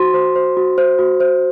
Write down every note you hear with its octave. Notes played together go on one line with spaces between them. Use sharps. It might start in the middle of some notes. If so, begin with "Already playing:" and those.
Already playing: F#4 C5 C6
C5
C5
F#4
C5
F#4
C5